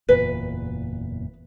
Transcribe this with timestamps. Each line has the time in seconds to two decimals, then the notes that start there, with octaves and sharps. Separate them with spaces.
0.09 F#1 E2 A#2 B4